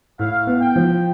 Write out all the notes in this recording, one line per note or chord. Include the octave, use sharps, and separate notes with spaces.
A2 F5
B3
G5
F3